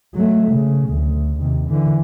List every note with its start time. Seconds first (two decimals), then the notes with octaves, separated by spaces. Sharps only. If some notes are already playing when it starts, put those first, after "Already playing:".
0.14 F#3 A3
0.50 C#3
0.88 D2
1.41 D#2 C3
1.69 D3 E3